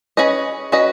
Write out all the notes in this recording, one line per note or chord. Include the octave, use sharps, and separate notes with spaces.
C#4 G#4 B4 D#5
C#4 F#4 B4 D#5